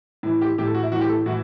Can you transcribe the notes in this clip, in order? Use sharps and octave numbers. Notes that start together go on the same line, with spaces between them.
A2 E3
G4
A2 E3 G4
A4
F#4
E4
A2 E3 F#4
G4
A4
A2 E3 F#4